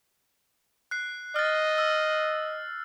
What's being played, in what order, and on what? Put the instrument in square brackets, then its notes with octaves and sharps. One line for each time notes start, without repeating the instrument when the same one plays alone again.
[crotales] F#6 C7
[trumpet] D#5 [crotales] F6 A6
[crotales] E6